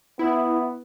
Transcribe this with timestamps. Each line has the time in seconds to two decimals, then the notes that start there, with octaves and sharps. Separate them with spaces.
0.19 B3 E4